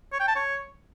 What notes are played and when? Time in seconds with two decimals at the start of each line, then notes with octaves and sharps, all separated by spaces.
0.12 C#5
0.20 G5
0.28 A5
0.35 C#5